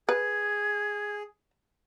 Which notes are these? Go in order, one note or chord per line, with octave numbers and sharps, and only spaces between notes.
G#4 B4 G#6